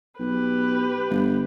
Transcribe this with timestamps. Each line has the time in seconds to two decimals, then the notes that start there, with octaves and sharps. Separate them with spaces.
0.20 B1 G4 B4
1.10 G1